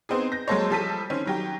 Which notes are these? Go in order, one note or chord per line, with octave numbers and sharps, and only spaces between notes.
B3 C4 D#4 G#4
G6 A#6
F#3 G#3 A#3 A4 C5 C#5
F3 G3 A4 A5 B6 D#7
D#3 C4 C#4
D#3 F#3 G4